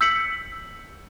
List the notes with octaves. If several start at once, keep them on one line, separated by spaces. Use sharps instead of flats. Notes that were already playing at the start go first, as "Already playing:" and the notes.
E6 G6 B6 C#7 F#7